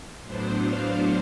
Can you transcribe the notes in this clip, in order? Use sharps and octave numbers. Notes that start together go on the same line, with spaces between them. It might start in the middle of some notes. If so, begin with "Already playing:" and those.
A2 F#3 B3 D4 C5
F5